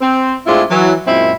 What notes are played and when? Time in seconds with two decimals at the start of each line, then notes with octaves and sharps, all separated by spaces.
0.01 C4
0.47 A2 G#3 C4 D4 E4 F4
0.71 E3 F#3
1.07 F#2 A#2 G#3 C4 E4